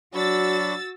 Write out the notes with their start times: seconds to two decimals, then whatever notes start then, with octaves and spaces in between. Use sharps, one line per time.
0.15 F#3 D4 F#4 B5 C#6 E6 A6